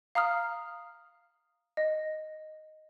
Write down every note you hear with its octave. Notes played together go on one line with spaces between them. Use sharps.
F5 A#5 D#6 F6
D#5